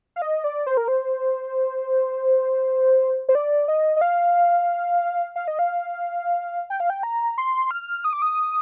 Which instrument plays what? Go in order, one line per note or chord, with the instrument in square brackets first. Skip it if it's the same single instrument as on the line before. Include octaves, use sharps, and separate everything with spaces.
[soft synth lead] F5
D#5
D5
C5
A#4
C5
C5
D5
D#5
D#5
F5
F5
D#5
F5
G5
F5
G5
A#5
C6
F6
D#6
D6
D#6